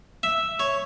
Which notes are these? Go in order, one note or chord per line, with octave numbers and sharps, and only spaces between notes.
E5
C#5